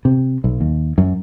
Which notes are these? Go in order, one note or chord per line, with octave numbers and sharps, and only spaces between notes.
C3
B1
D#2
F#2